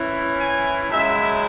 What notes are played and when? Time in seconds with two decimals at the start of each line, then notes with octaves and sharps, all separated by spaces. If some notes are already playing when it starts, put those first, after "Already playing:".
Already playing: E3 C#4 E4
0.39 G#5
0.90 F#2 C#3 G#3 E4 E5